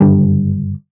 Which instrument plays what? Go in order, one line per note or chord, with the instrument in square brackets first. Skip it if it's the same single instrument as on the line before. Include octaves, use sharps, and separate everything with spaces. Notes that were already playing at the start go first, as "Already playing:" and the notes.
[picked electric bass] F#1 G2 D3 G3